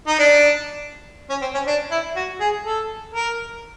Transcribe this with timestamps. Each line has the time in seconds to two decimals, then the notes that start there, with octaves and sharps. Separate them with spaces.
0.07 D#4
0.19 D4
1.30 C#4
1.42 C4
1.54 C#4
1.67 D4
1.91 E4
2.16 F#4
2.40 G#4
2.65 A4
3.15 A#4